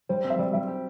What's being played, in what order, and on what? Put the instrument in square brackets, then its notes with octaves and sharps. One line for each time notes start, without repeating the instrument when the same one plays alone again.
[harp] G3 [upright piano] C5
[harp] C4
[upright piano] E5
[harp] G3 [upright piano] D5
[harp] G3 [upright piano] E5
[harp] G4